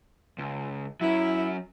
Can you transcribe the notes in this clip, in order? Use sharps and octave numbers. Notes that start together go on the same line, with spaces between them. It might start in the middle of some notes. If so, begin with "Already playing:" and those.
C#2
F#3 C#4 E4